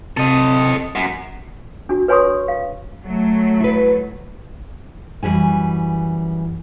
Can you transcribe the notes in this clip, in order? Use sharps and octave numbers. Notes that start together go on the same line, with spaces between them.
C3 A4 D#5
F#2
D4 F#4
B4 C#5 G#5 C6 C#6 D#6
F5
F#3 A3
E4 B4
F#2 E3 G3 G#5